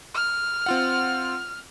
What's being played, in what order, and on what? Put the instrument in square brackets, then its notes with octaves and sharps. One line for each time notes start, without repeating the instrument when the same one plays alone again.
[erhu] F6
[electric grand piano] C4 F4 F#5